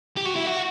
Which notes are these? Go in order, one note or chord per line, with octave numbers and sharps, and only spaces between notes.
G4
F#4
E4
F#4